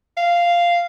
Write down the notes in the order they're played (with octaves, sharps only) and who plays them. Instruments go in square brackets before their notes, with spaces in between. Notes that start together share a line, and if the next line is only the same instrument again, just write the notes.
[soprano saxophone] F5